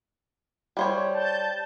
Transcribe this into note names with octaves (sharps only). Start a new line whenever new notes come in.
G3 C5 C#5
A5 G6